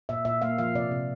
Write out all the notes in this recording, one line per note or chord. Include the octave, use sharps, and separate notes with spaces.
A#2 E5
A#2 E5
A#3 F5
F3 F5
C3 D5
C3